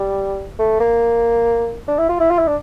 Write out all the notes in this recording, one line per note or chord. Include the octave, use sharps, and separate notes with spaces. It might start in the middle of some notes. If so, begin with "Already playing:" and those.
Already playing: G3
A3
A#3
D4
E4
F4
E4
F4
E4
D4